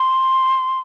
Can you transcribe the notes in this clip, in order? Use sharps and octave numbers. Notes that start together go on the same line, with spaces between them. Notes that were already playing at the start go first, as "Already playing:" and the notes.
Already playing: C6